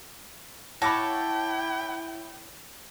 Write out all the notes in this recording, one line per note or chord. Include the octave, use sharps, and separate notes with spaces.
E4 C#5 F#5 G5 A5 B5 D6 A#6